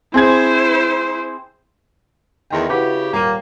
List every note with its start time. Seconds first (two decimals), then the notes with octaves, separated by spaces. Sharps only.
0.14 C4 E4 G#4 C5 G#6
2.50 E2 D#3 A3 G5 C6
2.69 C#3 E4 F#4 G4 B4
3.13 D#1 A#3 D#7